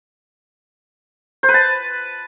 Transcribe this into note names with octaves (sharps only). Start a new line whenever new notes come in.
C5
B4
A5